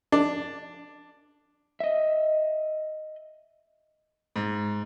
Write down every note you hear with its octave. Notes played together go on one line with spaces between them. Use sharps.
D4
D#5 E5
G#2